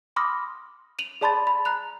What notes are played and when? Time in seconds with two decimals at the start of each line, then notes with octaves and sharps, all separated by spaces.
0.16 B5 C6 D6 D#6 F6 A#6
0.99 D#7 F7 F#7
1.21 G#4 D5 A5 B5 C6 A6
1.47 B5
1.65 A#5 F#6 F7